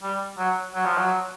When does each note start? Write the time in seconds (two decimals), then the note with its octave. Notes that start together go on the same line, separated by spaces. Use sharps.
0.03 G3
0.38 F#3
0.74 F#3
0.86 F3
0.97 F#3